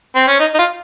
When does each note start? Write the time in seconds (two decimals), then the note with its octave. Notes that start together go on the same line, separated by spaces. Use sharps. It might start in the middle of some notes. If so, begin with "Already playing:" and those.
0.15 C4
0.27 C#4
0.39 D#4
0.54 D#4
0.58 F4